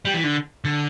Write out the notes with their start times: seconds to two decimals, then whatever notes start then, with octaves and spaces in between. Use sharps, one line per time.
0.05 G3
0.14 E3
0.24 D3
0.65 D3